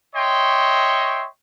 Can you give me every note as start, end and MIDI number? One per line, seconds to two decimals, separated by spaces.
0.15 1.26 73
0.15 1.26 75
0.15 1.26 76
0.15 1.26 79
0.15 1.26 84
0.15 1.26 85